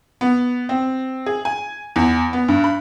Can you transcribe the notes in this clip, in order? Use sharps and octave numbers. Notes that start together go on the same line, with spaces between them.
B3
C4
G#4
G#5
E2
B3
G2
B5